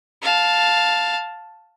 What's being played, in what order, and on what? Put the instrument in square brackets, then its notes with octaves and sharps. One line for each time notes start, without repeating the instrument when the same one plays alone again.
[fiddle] F5 A5